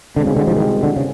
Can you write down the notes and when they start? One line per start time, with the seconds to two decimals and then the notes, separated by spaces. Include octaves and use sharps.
0.16 C2 B2 D3 G#3 C4
0.27 C#3
0.36 D3
0.47 F3
0.56 D#3
0.83 D3
0.96 C#3